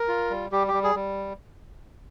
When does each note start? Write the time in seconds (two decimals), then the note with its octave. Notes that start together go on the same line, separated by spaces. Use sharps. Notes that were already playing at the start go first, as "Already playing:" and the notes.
Already playing: A#4
0.08 F4
0.30 G3
0.52 G3 G4
0.68 G4
0.73 G3
0.84 G#4
0.95 G3